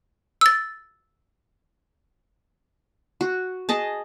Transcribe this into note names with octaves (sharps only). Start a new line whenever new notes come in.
E6 A6
F#4
G#4 D#5 A5